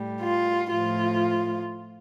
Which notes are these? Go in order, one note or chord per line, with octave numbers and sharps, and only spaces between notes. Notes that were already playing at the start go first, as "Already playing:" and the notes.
Already playing: A2 G3
F4
A2 F3 F4